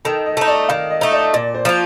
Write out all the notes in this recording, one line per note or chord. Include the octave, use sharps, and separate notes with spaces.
D#3 A4
D#5
A3 D#4
D5
D#3 F5
D#5
A3 D#4
D5
A#2 D5
C5
F3 A#3 F4